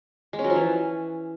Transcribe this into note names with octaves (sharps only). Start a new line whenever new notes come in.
G#3
C#4
F#3
F3
E3